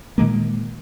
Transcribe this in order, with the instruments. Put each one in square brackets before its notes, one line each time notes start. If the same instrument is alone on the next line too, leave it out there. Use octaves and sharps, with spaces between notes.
[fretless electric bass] A#2 D#3 G#3 A#3